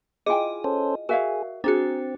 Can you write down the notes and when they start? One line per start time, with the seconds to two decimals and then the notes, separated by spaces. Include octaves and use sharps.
0.26 E4 F4 G#4 D#5 G5 G#5
0.64 C#4 A4 C5
1.09 F#4 G#4 A#4 D5 E5 F5
1.64 C4 D4 F#4 G#4 A#5